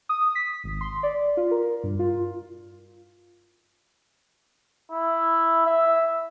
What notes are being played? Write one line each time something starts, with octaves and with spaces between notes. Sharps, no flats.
D#6
B6
G#1
C6
D5
F4
A#4
G2
F4
E4
E5